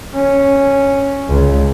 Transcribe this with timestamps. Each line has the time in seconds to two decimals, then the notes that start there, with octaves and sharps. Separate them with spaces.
0.15 C#4
1.29 C#2